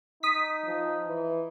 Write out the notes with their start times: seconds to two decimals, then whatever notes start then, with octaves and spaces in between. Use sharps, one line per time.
0.23 D#4 D#6 B6
0.65 F3
1.05 E3